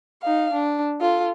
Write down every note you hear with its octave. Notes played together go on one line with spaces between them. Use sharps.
D#4 F5
D4
F4 A4